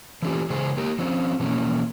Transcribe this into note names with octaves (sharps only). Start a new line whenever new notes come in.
E3 F#3 A3 C#4 F4 G4
C#3 E3 G#3 G#4 C5
A#3 G4 A#4
F3 C4 C#4
B2 E3 F3 A#3 C#4